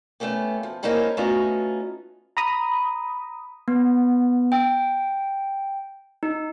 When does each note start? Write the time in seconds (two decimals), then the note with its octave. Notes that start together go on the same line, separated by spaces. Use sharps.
0.20 A3 B3 C#4 G4
0.63 F3
0.83 A#3 C4 C#4 D#4 E4 G4
1.17 A3 B3 C#4 D#4 F4 F#4
2.37 A#5 B5 D#6
3.68 B3
4.52 G5
6.23 D#4